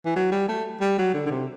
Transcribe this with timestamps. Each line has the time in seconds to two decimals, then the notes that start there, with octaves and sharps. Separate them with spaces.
0.05 E3
0.16 F#3
0.32 G3
0.49 A3
0.81 G3
0.99 F#3
1.14 D3
1.26 D3
1.31 C3